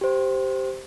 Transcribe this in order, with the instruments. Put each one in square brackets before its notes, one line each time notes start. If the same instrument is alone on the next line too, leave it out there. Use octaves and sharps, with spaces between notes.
[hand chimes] G4 C5